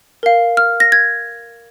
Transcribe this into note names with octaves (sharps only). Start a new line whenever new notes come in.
A#4 F5
F6
A#6
G#6